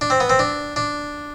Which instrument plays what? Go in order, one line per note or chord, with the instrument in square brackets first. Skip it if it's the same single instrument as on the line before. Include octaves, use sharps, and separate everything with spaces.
[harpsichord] D4
C4
B3
C4
D4
D4